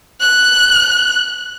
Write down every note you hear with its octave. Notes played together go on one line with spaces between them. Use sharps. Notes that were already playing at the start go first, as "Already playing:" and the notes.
F#6